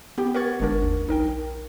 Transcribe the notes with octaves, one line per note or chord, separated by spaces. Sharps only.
B3 G4 G5
A#4 B4 F#5 C#6 G#6 A6
G1 G#3 D4 A#4
D#2
B1 D#4 A#4 G5